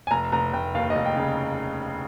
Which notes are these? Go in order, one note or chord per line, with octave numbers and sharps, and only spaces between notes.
G#5
F1 A#5
F1 A#5
F1 G5
D#2 F5
D#5
F1
G5
C#3